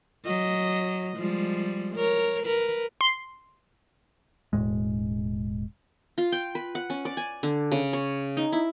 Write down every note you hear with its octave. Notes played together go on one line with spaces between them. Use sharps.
F#3 D#5
F3 G3 G#3
A#4 C#5
A#4 B4
C6
E1 F2 A2 G#3
F4
G5
B4
F#5
C#4
D5
G#5
D3
C#3
C#5
D#4
E4